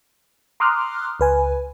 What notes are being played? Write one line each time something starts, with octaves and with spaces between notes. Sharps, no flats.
A#5 C6 D6 D#6 F6 F#6
C#2 B4 G#5